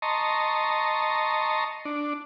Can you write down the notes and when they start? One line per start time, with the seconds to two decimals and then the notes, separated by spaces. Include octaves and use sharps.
0.02 D#5 A5 A#5 C6 C#6
1.85 D4